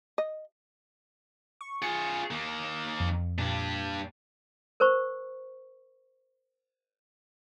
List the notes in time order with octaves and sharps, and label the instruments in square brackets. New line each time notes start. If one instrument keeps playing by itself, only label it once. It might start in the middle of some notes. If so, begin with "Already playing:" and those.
[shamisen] D#5
[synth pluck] C#6
[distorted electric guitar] F4 G#4 [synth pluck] C#7
[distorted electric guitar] D#3 A#3
[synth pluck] F2
[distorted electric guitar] G2 D4 [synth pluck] A#2
[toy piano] A#4 C5 C#6